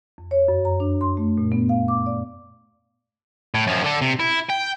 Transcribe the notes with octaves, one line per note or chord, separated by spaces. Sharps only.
F2
C#5
F#2
A#5
D4
C6
A3
A#2
B3
F5
D6
D5
A2
F#2 F3
D3 A4
C3
E4
G5